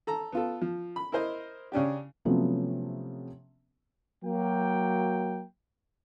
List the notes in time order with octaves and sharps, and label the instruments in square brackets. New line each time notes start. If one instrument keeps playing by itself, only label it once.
[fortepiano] A4 A#5
B3 F4 A4
F3
B5
E4 A#4 C5 D#5
C#3 C#4 D4 G4
[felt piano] C3 F3 F#3 A3 B3 C#4
[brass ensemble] F#3 A#3 G5